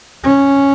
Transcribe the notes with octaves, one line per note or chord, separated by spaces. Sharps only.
C#4